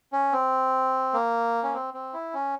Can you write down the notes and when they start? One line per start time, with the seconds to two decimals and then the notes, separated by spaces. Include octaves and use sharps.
0.12 C#4
0.32 C4
1.14 A#3
1.63 C#4
1.74 C4
1.94 C4
2.13 E4
2.34 C#4